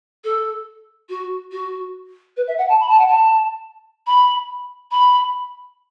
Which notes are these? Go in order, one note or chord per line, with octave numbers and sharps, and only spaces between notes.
A4
F#4
F#4
B4
E5
F#5
A5
B5
A5
F#5
A5
B5
B5